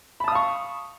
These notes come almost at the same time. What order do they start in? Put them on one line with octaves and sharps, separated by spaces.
B5 A5 D#6 F5 C#6